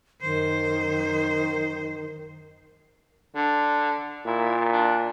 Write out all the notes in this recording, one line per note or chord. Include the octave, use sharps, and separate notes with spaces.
F#2 D#3 C5
D3
A#2 E4
D4